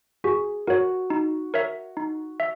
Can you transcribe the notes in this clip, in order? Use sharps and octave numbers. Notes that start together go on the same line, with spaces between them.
F#4 G#4
F#4 A#4 C#5
D#4
A#4 C#5 E5
D#4
E5